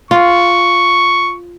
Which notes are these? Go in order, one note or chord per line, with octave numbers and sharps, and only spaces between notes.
F4 C#6